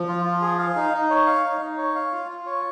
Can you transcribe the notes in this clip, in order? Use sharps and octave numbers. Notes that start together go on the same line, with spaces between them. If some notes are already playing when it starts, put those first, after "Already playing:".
Already playing: F3
F4
F4
G#4
F5
D#4
D#4
C#5
F5
D#4
D#4
C#5
F5
F4
F4
C#5